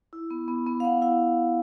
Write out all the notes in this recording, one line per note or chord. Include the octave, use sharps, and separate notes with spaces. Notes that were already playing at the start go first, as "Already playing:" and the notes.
E4
B3
B3
B3
F5
B3 F#5
E4 F5